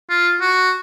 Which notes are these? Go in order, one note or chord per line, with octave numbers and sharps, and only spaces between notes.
F4
F#4